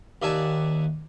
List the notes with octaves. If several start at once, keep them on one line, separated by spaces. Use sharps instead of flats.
D#2 D5 E5 G#5 A5